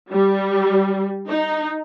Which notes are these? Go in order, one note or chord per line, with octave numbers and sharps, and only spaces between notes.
G3
D#4